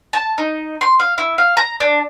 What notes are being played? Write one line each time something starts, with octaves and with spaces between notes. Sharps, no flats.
A5
D#4
C6
F5
E4
F5
A#5
D4